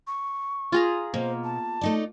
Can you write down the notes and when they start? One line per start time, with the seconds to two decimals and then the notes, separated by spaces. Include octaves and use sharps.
0.07 C#6
0.72 F4 G#4 A#5
1.14 B2 A#3 C5
1.44 A5
1.81 A3 D#4 D5